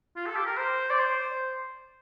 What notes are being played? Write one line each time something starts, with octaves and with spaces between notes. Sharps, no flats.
F4
A4
G4
A#4
C5
D5
C5